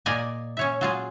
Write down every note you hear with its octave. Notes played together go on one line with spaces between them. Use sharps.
A#2 A#3 A#4 D5 D#5 G#5
C#4 C#5 E5
F#3 F4 G#4